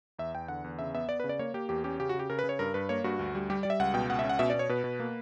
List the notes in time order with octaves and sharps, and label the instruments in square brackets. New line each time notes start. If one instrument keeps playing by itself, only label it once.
[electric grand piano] E2 E5
E2 G5
D3 F#5
E2
C#3 E5
B3 E5
B3 D5
B4
C#3
D5
A#3 C#5
A#3 G4
E2 G4
C#4 G4
C#3 G4
F#4
C#3
G4
C#3 A#4
B4
C#3
C#5
G2 A#4
G2 B4
A#3 C#5
G2 F#4
D2
G3
G3 G4
G3 D5
E5
C#2 F#5
B2 G5
C#2 F#5
E5
C#4
F#5
B2 E5
D5
B2
C#5
B2 B4
B2
A#3